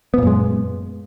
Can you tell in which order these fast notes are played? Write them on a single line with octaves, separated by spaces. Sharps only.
B3 A#2 F#2 G#3